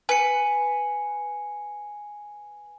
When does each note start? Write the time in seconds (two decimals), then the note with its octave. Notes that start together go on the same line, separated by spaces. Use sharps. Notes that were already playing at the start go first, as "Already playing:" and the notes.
0.09 B4 G#5 C#7